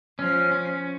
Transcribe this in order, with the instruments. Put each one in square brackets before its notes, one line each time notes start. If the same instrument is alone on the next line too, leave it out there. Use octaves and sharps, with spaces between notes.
[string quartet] F3 [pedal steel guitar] C#4
[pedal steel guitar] C#4